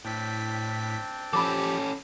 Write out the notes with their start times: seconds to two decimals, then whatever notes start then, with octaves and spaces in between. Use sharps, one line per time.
0.05 A2 C4 D4 G5 B6
1.33 F3 C#4 G4 A4 B5 D6